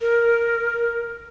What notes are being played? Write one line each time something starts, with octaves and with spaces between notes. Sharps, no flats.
A#4